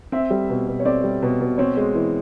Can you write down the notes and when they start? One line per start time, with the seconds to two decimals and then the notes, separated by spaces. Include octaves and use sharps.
0.12 C4 E5
0.30 G3
0.49 B2
0.67 B2
0.80 C#5
0.85 C4 D5
1.04 G3
1.22 B2
1.41 B2
1.58 C4 C#5
1.77 G#3
1.94 E3